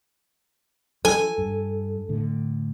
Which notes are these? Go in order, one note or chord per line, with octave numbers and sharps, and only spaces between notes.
F3 A4 G#5
G2
A2 D3